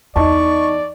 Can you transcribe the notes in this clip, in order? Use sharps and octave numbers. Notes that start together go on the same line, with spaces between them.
E2 D#4 D5 D#5 A5 C#6